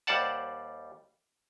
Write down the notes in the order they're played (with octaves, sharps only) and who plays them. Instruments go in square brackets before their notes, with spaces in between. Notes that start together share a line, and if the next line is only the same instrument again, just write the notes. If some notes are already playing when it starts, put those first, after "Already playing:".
[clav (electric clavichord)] D#2 G3 C5 D5 F#5 A5